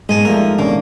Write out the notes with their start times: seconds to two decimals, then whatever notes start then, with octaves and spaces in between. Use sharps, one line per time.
0.09 G#2 B2 G#3 A#4 D#5 G#5 A5
0.25 F3 G3 A3 A#3 D#4 A#4
0.59 B2 D#3 A#3 C#4 D4